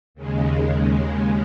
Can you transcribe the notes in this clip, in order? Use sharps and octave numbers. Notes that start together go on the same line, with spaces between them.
D#2 C#3 G#3